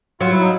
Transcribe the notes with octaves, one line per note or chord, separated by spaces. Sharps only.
F#3 F4
E4
D#4